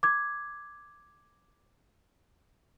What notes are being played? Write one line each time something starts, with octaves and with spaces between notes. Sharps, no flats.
D6 G#6